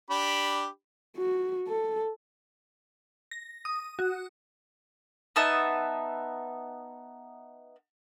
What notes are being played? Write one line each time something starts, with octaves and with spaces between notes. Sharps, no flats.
D4 G4 B5
F#4
A4
A#6
D#6
F#4
B3 D#4 E5 A5